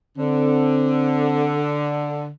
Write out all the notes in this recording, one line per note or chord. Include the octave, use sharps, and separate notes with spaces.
D3 C4